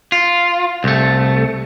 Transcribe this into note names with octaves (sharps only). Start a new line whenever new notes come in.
F4
C2 A3